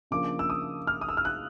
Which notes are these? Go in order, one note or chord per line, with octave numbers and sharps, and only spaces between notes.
C#3 F3 A#3 D4 D6
E6
D#6
F6
D#6
E6
F6
F#6